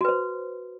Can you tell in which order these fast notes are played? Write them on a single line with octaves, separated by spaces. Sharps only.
F#4 B4 C5